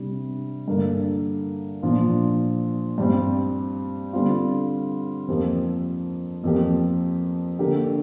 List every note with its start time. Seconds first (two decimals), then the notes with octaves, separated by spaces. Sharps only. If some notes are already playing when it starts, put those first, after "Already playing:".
Already playing: C3 G3 D4
0.68 G2 D3 A#3
1.82 A#2 F3 D4 F4
2.98 G2 G3 C4
4.13 D3 G3 C4 F4
5.29 F2 F3 A#3 G4
6.44 F2 F3 A#3 G4
7.59 D3 A#3 G4